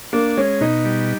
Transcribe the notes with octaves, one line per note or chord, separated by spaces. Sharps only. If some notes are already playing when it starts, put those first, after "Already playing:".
A#3 D4
G#3 C#4
B2 D#4
G3